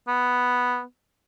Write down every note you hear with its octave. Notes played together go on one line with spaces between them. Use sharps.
B3